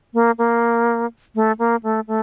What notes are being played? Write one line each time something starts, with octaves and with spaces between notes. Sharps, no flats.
A#3
A#3
A3
A#3
A3
A3